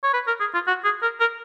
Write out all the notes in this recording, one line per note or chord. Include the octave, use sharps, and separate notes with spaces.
C#5
B4
A#4
G#4
F4
F#4
G#4
A#4
A#4